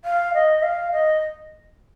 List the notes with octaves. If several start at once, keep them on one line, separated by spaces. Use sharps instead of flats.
F5
D#5
F5
D#5